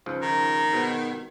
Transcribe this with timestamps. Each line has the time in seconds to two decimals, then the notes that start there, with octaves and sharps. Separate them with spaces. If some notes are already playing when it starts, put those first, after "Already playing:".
0.06 C#2 G#2 F3
0.22 D#3 A#5
0.72 G#2 B2 B3